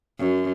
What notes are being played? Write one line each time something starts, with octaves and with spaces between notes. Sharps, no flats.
F#2